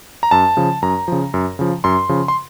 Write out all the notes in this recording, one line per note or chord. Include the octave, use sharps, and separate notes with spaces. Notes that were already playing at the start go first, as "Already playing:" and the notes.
A#5
F#2 A5
C#3 F3
F#2 A#5
C#3 F3
F#2
C#3 F3
F#2 C6
C#3 F3
C6